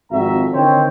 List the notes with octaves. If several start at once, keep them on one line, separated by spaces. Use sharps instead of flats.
G#1 F2 F#4 E5 A#5
D3 D#3 C4 C5 C#5